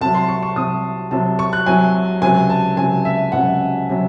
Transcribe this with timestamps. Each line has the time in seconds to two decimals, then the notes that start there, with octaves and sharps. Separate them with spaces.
0.01 C2 C3 F#3 A5
0.14 C6
0.28 C#6
0.43 C#6
0.56 C2 C3 F#3 D#6
1.11 C2 C3 F#3 A5
1.39 C#6
1.53 F#6
1.66 C2 C3 F#3 G#5
2.22 C#2 C3 F#3 G#5
2.50 A5
2.77 C#2 C3 F#3 G#5
3.05 E5
3.32 C#2 C3 F#3 F#5
3.89 C3 F#3